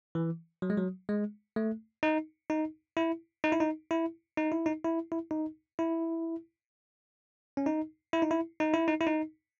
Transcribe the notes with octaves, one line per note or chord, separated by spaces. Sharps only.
E3
F#3
G#3
F#3
G#3
A3
D#4
D#4
E4
D#4
E4
D#4
E4
D#4
E4
D#4
E4
E4
D#4
E4
C#4
D#4
E4
D#4
E4
D#4
E4
D#4
E4
D#4